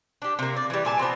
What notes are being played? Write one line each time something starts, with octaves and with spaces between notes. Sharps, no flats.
D4 G4
C3 A#3
D5
E3 G3
A#2 G#5 A5
F3 B3 C4